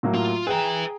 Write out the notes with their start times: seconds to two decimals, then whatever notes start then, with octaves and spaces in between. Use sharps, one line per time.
0.03 A2 F#3 A#3
0.14 F4
0.47 G#4 B4 E5 G5 A#5